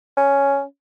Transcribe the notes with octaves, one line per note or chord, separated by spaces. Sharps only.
C#4